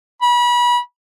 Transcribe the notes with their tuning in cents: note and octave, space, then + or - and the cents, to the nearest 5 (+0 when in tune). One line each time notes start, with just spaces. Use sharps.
B5 -30